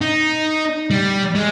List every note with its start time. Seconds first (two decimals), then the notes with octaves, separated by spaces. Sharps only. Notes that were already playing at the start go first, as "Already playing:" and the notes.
0.01 D#4
0.91 G3
1.35 G#3